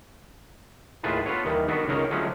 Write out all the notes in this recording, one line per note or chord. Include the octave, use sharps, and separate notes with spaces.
D#2 A2 F4 G#4 B4 A5
B3 F4 A4 B4 C#5
D#2 D#3 E3 G3
D#3 B3 D4 F#4 A4 B4
C#2 D#3 A#4 C#5
D3 F3 F#3 G#3 A3 C#4